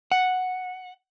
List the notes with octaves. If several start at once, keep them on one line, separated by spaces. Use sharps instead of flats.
F#5